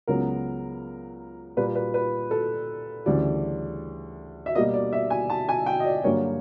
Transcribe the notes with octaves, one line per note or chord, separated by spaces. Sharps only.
C#2 C#3 F#3 B3 A#4
A#2 G3 A#3 B4
B4
B4
A4
D2 C#3 E3 G3 D5
E5
B2 G3 A#3 D#5
D5
E5
G#5
A5
G#5
G5
D#5
D5
G2 D3 F#3 A#3 C#5